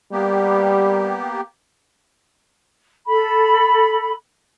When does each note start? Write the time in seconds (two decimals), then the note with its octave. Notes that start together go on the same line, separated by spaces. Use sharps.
0.12 G3 A#3 B3 G4
3.07 A4 B5